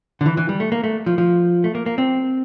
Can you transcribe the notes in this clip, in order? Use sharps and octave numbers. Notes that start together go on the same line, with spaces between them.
D3
E3
E3
G3
A3
A#3
A3
F3
F3
A3
A#3
A#3
C4